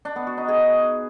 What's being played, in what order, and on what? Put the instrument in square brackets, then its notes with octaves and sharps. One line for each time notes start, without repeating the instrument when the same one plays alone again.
[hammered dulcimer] D4
B3
F#4
D#4
G#4